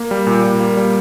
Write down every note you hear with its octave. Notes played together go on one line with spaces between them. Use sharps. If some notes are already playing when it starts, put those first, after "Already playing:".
Already playing: A#3
G3
A#2
A#2
A#3
G3